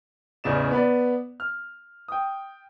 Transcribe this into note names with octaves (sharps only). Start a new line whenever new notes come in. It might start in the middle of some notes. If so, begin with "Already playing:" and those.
A1 E2 C#3 D5 E7
B3 B4 D5
F6
G5 D#6